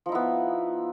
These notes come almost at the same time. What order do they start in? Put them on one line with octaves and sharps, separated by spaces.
F3 D#4 E4 B3